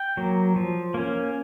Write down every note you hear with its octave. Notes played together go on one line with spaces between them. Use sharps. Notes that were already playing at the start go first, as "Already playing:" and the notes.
Already playing: G5
F#3 A#3
F3
A#3 C#4